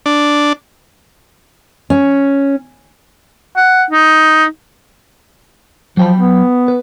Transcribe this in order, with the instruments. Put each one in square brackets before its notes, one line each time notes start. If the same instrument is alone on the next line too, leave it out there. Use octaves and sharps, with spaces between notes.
[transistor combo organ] D4
[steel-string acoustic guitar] C#4
[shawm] F#5
D#4
[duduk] F3 [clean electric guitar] F#3 G5 B5
[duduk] B3
[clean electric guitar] B4